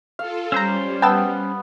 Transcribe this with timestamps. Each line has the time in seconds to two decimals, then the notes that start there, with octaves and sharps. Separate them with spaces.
0.19 F4 A4 F5
0.52 G3 C#4 C5 A#5 E6 G6
1.02 B3 G5 A5 E6